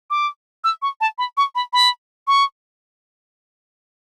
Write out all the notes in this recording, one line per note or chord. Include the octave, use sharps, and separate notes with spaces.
D6
E6
C#6
A5
B5
C#6
B5
B5
C#6